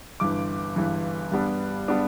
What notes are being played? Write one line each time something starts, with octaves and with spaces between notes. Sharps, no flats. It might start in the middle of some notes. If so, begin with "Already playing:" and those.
G1 G2 E3 D6
G1 G2 E3
G2 G3 B3 D4
G3 B3 D4